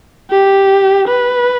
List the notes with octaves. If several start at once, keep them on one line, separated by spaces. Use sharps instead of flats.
G4
B4